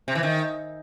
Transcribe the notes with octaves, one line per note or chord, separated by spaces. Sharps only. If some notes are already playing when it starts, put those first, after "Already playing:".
C3
E3
D#3